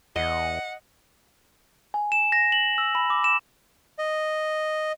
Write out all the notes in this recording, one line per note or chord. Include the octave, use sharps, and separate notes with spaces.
E2 D#5 F#5
G#5
E7
A#6
F#7
E6
B5
D6
E7
D#5